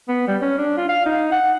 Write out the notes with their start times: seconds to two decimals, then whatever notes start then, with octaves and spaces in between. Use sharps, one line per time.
0.09 B3
0.28 G3
0.42 C#4
0.58 D4
0.78 F4
0.89 F5
1.06 D#4
1.32 F#5